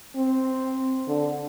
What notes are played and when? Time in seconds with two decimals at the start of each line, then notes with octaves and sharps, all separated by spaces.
0.16 C4
1.08 D3